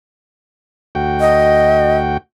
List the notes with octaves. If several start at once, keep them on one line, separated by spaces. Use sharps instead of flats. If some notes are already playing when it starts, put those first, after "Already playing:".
D2 F#4 G5
D#5